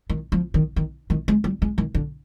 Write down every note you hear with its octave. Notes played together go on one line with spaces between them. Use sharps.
D#3
F3
D#3
D#3
D#3
G#3
G3
G#3
D#3
D3